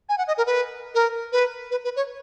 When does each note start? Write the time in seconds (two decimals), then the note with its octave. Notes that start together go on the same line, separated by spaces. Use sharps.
0.09 G#5
0.18 F#5
0.28 D#5
0.38 A#4
0.47 B4
0.95 A#4
1.32 B4
1.71 B4
1.84 B4
1.96 C#5